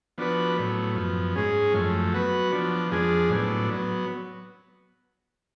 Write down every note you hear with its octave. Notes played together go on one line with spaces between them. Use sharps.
F3 B3 D4 F#4 B4
A2 F#3 B3
F#2 F3 B3
G#2 G#3 C#4 G#4
F#2 F3 A3
F#3 B3 F#4 B4
F3 B3 D4
F2 F3 G#3 D4 G#4
A2 F#3 B3 D4
F#3 B3